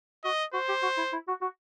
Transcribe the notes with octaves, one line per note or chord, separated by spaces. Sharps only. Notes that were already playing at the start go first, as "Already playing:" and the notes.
F#4 D#5
F#4 C5
G4
F#4
E4
E4
F#4
F#4